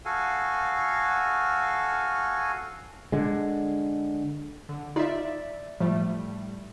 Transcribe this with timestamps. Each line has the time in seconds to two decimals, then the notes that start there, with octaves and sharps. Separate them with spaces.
0.05 F#4 A4 F5 G#5
3.12 D3 G#3
4.69 D3
4.96 D#4 F4 D5 E5
5.80 A2 F3 G3 A3